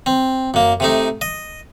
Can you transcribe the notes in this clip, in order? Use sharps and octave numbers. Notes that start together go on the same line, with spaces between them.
C4
F#2 A#3
C3 A3 D#4
D#5